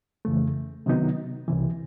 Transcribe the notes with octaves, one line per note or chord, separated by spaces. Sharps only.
F2 C#3 E3 A3
C3 D#3 F#3 B3 D#4
C2 C3 E3